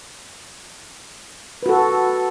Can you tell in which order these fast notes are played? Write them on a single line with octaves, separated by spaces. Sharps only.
B4 F#4 A4